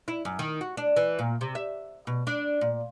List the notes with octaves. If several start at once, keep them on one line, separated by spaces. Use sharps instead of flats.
E4
F#2
D#3
F#4
D4
E3
A#2
C3
E5
B2
D4
A#2